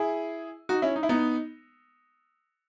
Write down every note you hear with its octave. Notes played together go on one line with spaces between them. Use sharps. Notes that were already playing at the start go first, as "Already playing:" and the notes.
Already playing: E4 G#4
D#4 F#4
C#4 E4
D#4
E4
B3 D#4